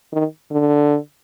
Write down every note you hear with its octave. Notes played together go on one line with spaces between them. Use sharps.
D#3
D3